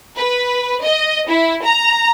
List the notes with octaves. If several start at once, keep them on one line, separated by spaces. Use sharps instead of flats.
B4
D#5
E4
A#5